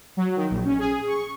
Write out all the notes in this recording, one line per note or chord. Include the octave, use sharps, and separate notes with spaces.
F#3
D#3
A#1
C#4
G#4
C#6